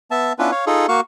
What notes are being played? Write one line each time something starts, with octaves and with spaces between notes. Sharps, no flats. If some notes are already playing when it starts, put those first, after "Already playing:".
B3 E5 A5
B3 C#4 D4 E4 F4 B4
C#5 F5
D#4 F4 G#4 A4
A#3 F#4 F5 C#6